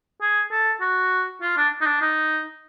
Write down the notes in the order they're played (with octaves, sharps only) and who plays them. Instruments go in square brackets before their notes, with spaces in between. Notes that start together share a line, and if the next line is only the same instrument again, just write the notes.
[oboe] G#4
A4
F#4
F4
D4
D#4
D4
D#4